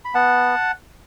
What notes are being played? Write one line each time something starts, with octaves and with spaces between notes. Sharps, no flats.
B5
B3 F#5 A5